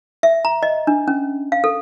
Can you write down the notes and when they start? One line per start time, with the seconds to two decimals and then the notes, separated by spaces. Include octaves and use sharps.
0.23 E5
0.45 A#5
0.63 D#5
0.87 D4
1.08 C#4
1.52 F5
1.64 A4